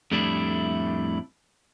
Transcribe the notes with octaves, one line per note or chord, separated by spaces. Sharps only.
F2 A2 G3 A3 D4 E4